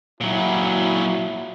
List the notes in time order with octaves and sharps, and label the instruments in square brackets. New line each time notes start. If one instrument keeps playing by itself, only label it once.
[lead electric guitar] A#2 F#3 [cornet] E4